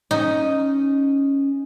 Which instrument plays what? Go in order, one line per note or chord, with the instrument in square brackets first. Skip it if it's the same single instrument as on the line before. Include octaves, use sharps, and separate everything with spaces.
[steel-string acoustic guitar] C#4 D#5 [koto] D#4